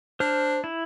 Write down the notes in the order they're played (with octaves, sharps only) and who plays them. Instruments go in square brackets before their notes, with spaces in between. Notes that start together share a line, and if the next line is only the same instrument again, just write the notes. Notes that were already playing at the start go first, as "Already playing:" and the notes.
[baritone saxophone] D4 [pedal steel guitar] C5 F6
[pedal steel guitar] E4